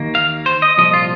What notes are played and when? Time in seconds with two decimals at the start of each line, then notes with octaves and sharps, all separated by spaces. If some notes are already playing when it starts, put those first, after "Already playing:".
Already playing: D#2 D#3 A#3
0.15 F5
0.46 C5
0.62 D#5
0.78 C2 A#2 F3 D#5
0.93 F4